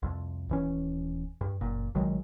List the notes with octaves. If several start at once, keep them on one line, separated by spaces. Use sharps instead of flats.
C2 F2
D#1 E3 C#4
G2
F#1 A#2
A#1 D#3 F#3 G#3